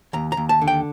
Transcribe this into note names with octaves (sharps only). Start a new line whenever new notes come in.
D#2 A#5
A#5
D#2
A5
D3
G5